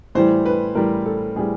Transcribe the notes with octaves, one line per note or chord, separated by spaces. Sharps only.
A2 E3 G3 C5
B4
A2 E3 G3 A#4
A4
A2 E3 G3 G#4